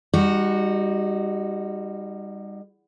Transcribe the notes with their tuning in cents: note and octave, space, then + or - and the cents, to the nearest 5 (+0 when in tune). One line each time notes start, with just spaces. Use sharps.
G3 +30 D#4 +0 F#4 +0